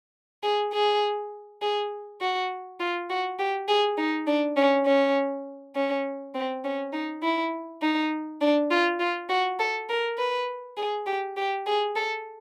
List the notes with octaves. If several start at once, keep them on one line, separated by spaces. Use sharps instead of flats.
G#4
G#4
G#4
F#4
F4
F#4
G4
G#4
D#4
D4
C#4
C#4
C#4
C4
C#4
D#4
E4
D#4
D4
F4
F4
F#4
A4
A#4
B4
G#4
G4
G4
G#4
A4